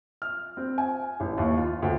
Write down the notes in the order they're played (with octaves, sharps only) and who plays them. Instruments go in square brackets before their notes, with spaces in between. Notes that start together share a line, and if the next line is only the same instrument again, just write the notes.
[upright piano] F6
C4
G#5
A1
D#2
F4
D2